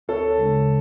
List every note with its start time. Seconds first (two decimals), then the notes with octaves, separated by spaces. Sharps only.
0.08 D2 A4 C#5
0.38 C#3 G#3 D4